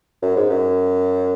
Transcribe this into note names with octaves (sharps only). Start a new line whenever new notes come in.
F#2
G#2
F#2